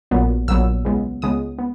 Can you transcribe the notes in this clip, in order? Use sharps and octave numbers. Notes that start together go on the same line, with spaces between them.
A#1 A#2 F#3 B3
A#1 A#2 F#3 B3 E6
C#2 C#3 G#3 B3
C#2 C#3 G#3 B3 D#6
B3